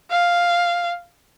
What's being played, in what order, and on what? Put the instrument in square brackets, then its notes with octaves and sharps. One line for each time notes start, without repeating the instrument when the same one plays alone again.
[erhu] F5